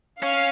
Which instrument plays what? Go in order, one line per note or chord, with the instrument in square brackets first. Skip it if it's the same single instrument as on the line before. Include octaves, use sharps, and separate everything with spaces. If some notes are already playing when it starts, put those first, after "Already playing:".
[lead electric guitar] C#4 [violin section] F5